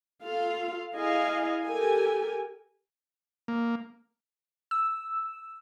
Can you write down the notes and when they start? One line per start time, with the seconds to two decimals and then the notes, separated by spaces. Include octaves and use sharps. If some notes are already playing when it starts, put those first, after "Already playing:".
0.24 F4 A4 F5
0.94 E4 G#4 D#5 F5 G#5
1.66 G4 A4 A#4 G#5
3.48 A#3
4.71 E6